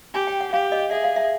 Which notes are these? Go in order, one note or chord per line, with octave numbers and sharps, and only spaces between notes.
G4 G#5
G5
F#5
G4 F5
D#5
G#4 E5
F5
E5